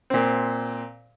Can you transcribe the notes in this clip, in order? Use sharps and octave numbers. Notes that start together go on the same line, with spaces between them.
A#2 C4